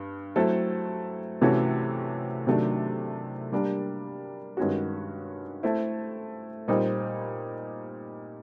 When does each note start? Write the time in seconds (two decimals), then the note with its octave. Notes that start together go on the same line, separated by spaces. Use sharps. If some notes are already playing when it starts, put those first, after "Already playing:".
Already playing: G2
0.36 F#3 A3 C4 E4 A4
1.41 C3 E3 A3 C#4 F#4
2.47 C3 D#3 F#3 A3 D4
3.52 G3 A#3 D4 G4 A#4
4.57 G2 D#3 G#3 C#4 F#4
5.63 A3 C4 E4
6.68 A#2 G3 C4 D#4